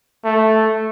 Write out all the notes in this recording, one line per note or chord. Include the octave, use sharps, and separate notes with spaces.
A3